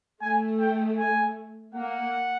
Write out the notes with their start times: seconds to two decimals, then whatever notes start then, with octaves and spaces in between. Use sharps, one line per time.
0.22 A3 G#5
0.60 G5
0.98 G#5
1.75 A#3 F#5